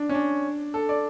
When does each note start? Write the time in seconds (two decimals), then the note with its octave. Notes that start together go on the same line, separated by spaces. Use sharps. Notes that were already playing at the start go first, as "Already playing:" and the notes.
Already playing: D4
0.09 C#4
0.14 D4
0.74 A4
0.89 D5